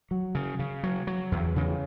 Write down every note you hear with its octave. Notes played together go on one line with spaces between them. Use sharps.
F#3
C#3
C#3
F#3
F#3
E2
C#3